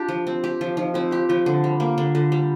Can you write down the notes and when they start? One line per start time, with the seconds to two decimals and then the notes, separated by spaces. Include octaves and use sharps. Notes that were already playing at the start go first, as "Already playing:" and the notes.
Already playing: D4 F4 G4
0.08 F3
0.27 C4
0.44 G4
0.61 F3
0.77 F3 D#4
0.94 C4 F4
1.11 F4 G4
1.29 F3 F4
1.46 D3
1.64 G3
1.80 A#3
1.98 D3
2.15 D3 F4
2.32 G3